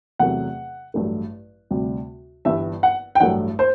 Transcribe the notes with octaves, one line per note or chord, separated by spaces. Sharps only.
E2 C3 F#3 A3 F#5
A1 G2 F#3 A3
D2 C3 G3
G1 G2 E3 G3 E5
F#5
G5
A1 G2 F#3 A3 F#5
C5